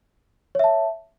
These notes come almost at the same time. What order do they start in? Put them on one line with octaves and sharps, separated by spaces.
C#5 E5 A5